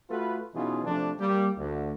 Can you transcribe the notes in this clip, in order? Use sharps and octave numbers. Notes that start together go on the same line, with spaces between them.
A3 F4 F#4 A4 B4
B2 E3 C#4 D#4 F4 G#4
C3 F3 A3 D4
G3 A#3 G4
D2